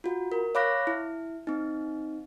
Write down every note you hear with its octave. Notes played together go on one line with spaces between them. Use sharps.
F4 F#4
A#4
C#5 F5 B5 D6 F#6 A#6
E4
C4 D#4